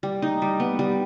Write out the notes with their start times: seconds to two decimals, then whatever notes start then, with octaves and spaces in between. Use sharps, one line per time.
0.03 G3
0.22 D#4
0.42 G3
0.60 B3
0.79 G3